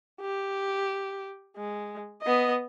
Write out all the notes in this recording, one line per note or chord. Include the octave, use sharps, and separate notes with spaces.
G4
G#3
B3 D#5